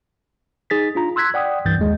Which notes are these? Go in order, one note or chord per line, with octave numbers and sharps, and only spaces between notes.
D#4 G#4 A6 B6
D4 F4 A#5
C6 E6 F#6 G#6 B6
D5 F#5 G5 D#6
C2 G2 E3 G6 A6
D#2 G#3